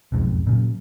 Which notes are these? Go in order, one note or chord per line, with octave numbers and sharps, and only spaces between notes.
E1 B1 F2 G#2
A#2 C#3 F#3